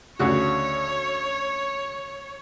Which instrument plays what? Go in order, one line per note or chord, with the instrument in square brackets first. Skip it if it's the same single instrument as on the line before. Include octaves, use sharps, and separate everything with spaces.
[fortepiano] D2 C#3 F#4 [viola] C#5